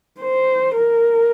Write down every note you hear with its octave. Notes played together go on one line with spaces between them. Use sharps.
C5
A#4